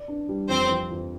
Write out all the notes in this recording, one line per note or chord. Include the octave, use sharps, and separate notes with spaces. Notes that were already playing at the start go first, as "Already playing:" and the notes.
Already playing: D5
D4
G3
F2 C4 C5
F3
F2